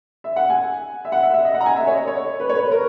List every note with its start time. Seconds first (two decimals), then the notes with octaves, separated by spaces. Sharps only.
0.24 E5
0.36 F#5
0.50 G#5
1.05 E5
1.12 F#5
1.23 E5
1.34 E5
1.44 D#5
1.54 F#5
1.60 A#5
1.66 G#5
1.76 E5
1.87 C#5
1.91 D#5
2.07 C#5
2.40 B4
2.49 C#5
2.55 B4
2.71 A#4